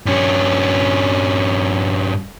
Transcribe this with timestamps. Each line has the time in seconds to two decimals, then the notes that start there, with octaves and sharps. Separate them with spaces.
0.06 G2 C#4